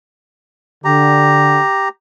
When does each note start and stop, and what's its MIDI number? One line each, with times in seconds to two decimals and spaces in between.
0.85 1.60 50
0.85 1.89 67
0.85 1.89 82